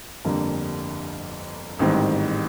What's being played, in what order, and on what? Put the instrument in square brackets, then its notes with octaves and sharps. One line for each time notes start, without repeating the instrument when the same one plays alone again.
[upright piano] G1 F2 D3 G3 A#3
A1 G#2 D#3 G3 C4